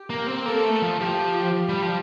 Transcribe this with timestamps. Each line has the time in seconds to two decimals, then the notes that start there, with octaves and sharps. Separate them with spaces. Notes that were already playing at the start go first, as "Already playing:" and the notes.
Already playing: G4
0.10 A#3
0.28 C4
0.46 A#3 A4
0.64 A3
0.82 F3
1.00 F3 G4
1.69 G3
1.82 F3